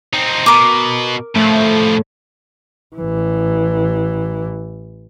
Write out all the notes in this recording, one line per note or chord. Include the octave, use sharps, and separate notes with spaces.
C4 D#4
B2 A#4 D6
A2 F3 A3
A1 E3